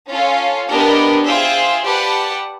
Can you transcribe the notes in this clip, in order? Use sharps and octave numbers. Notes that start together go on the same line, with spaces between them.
C#4 F4 A4
B3 D4 G4 A#4 D#5
F4 G#4 C5 E5 G5
G4 B4 D5 F#5 A5